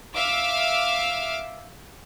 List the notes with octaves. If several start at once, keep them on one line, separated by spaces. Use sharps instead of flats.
E5 F5 D6 F6